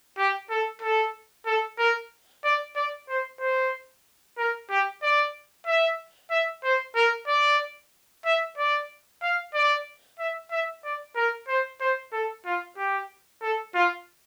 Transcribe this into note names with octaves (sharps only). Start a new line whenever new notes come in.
G4
A4
A4
A4
A#4
D5
D5
C5
C5
A#4
G4
D5
E5
E5
C5
A#4
D5
E5
D5
F5
D5
E5
E5
D5
A#4
C5
C5
A4
F4
G4
A4
F4